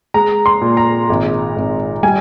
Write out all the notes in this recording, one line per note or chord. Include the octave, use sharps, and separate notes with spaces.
G#3 A#5
C6
A#2
A#5
G#1
G#1
G3 G#5